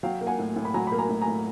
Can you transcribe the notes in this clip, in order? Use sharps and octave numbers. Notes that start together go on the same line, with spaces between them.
F#3 F5 G5
A#3
F#5 G#5
A2
A2
B5
F#3 G#5 A#5
A#3 B5
G#5 A#5
A2
G#5 A#5
A2